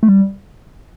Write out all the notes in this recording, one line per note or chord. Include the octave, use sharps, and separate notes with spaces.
A3
G3